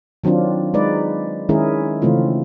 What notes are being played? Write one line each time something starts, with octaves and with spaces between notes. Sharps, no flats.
D#3 F#3 C4 D4 F4
G#3 D#4 B4 D5
D#3 G#3 C#4 E4 G#4 A#4
C#3 E3 A3 C4 F4